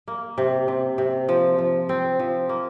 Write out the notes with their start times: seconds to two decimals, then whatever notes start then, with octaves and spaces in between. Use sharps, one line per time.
0.08 A#3
0.38 C3
0.68 C3
0.98 C3
1.29 F3
1.59 F3
1.89 C4
2.19 F3
2.49 A#3